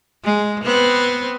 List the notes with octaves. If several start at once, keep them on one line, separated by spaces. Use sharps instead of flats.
G#3
B3 C4